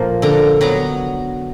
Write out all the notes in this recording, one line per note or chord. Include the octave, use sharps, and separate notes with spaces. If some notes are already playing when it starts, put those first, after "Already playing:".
Already playing: A#2 F3 A#3
D3 A#5
F#3 B3 A#5